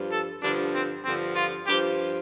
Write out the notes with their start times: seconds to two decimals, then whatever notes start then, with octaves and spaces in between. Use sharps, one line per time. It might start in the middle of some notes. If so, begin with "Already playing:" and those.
Already playing: G2 F3
0.12 A4
0.42 G2 D3 F3 D4
0.73 C4
1.04 G2 D3 F3 C4
1.36 F4
1.67 G2 F3 G4